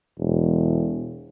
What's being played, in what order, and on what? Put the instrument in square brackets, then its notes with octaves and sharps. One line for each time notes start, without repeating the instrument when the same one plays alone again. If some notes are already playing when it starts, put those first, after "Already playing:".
[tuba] E1